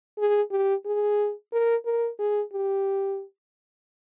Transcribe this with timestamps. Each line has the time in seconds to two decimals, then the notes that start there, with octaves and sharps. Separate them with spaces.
0.18 G#4
0.51 G4
0.86 G#4
1.52 A#4
1.86 A#4
2.19 G#4
2.53 G4